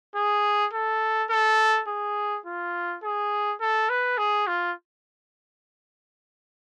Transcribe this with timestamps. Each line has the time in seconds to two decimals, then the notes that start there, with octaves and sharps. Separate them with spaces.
0.16 G#4
0.74 A4
1.30 A4
1.88 G#4
2.46 F4
3.03 G#4
3.60 A4
3.89 B4
4.18 G#4
4.47 F4